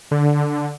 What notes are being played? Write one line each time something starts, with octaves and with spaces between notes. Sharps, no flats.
D3